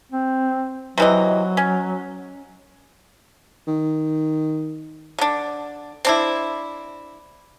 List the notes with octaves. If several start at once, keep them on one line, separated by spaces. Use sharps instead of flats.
C4
C3 E3 F#3 D#5
C#4
D#3
D3 D4
C4 D4 E4